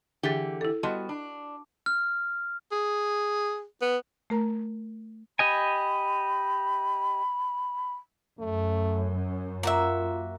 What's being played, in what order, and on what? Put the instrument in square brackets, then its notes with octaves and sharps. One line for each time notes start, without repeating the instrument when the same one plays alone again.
[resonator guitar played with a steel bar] D3 E3 G4 [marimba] G#4 A6
[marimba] E4 A4
[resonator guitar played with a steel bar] G3 B3 F#4 [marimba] D#5 A5 C6
[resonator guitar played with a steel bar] D4
[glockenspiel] F6
[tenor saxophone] G#4
B3
[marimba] A3 A#4 A#5
[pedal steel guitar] G4 D#5 G#5 [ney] B5
[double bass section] F#2 [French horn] A3
[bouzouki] A#3 F#4 E5 [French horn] F4